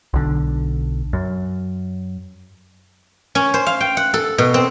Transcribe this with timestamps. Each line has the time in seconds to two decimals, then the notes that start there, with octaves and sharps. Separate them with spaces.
0.14 B1 D3
1.13 F#2
3.35 C#4
3.54 C5
3.67 F5
3.81 G5
3.97 F#5
4.14 A4
4.38 B2
4.54 C4